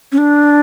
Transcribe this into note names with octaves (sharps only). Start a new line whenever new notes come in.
C#4
D4